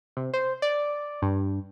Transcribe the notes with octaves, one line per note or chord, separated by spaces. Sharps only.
C3
C5
D5
G2